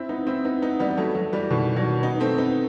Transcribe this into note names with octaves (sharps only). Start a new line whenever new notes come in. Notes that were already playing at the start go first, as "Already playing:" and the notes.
Already playing: C4 E4
B3 D#4
C4 E4
B3 D#4
B3 D#4
G3 B3
F#3 A3
F#3 A3
E3 G3
B2 D#3
D#3 F#3
B3 D#4
A3 C4
B3 D#4